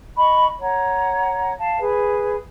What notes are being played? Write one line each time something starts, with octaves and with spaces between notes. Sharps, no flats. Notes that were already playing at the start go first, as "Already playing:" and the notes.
D#5 B5 C#6
C#5 F#5 A#5
F5 A5
G#4 B4